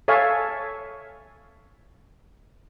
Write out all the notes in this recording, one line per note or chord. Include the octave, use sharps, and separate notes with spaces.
A4 C#5 E5 F5 G#5 A5